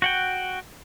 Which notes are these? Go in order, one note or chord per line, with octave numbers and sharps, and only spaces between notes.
F#4 F#5 G5